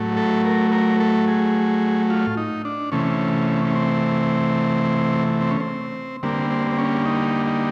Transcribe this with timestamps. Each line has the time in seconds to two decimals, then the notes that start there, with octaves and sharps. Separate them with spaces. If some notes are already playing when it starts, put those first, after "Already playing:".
Already playing: A2 F#3 A3
0.17 A4
0.45 A#4
0.72 A#4
1.00 A4
1.28 G#4
2.10 F4
2.37 D#4
2.65 D4
2.92 C3 E3 A3 C#4
3.65 C#4
3.75 C4
5.41 C4
5.51 C#4
5.60 C4
6.23 D3 G3 A#3 C4
6.50 C4
6.71 C4
6.78 C#4
7.05 D#4
7.46 D#4